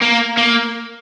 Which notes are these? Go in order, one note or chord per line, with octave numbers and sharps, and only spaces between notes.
A#3
A#3